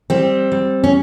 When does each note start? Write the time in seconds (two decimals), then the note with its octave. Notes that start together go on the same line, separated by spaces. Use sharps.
0.10 G3 C4
0.52 G3
0.84 C#4